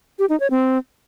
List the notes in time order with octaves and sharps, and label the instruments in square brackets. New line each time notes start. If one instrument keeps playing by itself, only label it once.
[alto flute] G4
D#4
C#5
C4